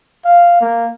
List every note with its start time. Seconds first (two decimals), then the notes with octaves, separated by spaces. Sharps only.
0.25 F5
0.61 A#3